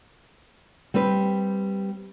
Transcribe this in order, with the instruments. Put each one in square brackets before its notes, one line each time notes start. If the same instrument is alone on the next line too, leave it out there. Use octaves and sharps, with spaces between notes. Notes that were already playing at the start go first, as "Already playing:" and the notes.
[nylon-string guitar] G3 C4 G4 B4